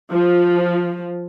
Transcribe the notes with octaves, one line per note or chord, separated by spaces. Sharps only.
F3